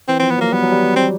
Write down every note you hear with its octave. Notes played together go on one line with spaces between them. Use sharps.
E3 C4
F3 C4
B3
F#3 A#3
G3 B3
F#3
G3
C4